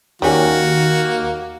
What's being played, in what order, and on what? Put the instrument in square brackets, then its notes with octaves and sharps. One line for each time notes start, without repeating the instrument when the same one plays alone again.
[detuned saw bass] D#2 [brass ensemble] D#3 [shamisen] G3 C#4 [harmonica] A#3 F#4